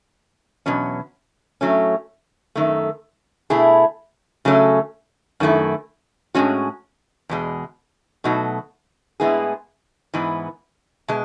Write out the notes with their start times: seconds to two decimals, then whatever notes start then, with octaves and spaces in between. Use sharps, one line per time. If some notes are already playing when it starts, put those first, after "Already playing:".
0.66 E2 B2 F#3 C#4
1.61 A2 F#3 A3 C#4
2.55 F#2 D#3 A3
3.50 B2 A3 E4 G#4
4.45 C#3 F#3 A3 C#4
5.40 F#2 D#3 A3 E4
6.35 A2 G#3 C#4 F#4
7.29 E2 B2 G#3
8.24 B2 F#3 A3 D#4 F#4
9.20 A2 G#3 B3 E4 G#4
10.14 G#2 E3 B3
11.08 B2 G#3